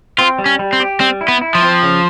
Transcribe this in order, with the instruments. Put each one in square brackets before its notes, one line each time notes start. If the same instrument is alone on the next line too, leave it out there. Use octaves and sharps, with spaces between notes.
[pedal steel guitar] C4 [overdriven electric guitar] F4
[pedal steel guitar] G3
[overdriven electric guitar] C#4
[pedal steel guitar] G3
[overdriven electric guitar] C4
[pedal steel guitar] G4
[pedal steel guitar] G3 [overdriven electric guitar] C4
[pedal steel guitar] E4
[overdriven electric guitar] B3
[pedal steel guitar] E4
[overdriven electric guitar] F3
[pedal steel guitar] C4
C#3